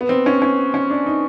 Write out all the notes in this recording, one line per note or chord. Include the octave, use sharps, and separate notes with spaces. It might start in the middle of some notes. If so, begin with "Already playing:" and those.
B3
C4
C#4
C#4
C#4
D4
D#4